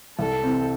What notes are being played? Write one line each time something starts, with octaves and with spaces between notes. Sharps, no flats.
C2 A4
C3 E3 C4